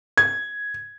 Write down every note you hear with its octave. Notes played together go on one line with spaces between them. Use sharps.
G#6